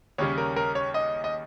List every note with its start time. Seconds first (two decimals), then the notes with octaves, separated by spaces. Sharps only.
0.18 D#2 C#3 G3 C#4 C#5
0.38 A#4
0.56 A#4
0.75 C#5
0.94 D#5
1.24 D#5